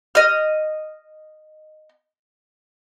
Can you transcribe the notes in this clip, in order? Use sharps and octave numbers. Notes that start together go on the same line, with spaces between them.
D#5 F6